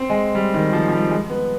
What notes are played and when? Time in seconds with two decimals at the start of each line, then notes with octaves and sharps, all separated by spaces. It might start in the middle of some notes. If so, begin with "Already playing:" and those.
Already playing: C4
0.10 G#3
0.35 G3
0.54 D#3
0.73 F3
0.88 F3
0.92 G3
1.10 G#3
1.30 B3